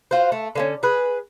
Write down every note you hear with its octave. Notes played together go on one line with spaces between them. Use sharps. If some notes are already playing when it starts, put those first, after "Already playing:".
F4 F#4 C5
A3
D3 A#3 C#4
G#4 B4